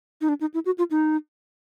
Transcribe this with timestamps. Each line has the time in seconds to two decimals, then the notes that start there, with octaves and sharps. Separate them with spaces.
0.21 D#4
0.29 D4
0.41 D#4
0.54 E4
0.66 F#4
0.78 F4
0.91 D#4